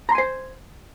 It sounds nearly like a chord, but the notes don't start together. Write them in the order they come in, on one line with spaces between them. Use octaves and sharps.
A#5 C6 G#5 C5